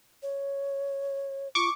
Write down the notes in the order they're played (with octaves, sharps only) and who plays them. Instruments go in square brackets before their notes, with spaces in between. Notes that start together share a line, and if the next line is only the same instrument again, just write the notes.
[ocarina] C#5
[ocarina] F4 [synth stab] C#6 D6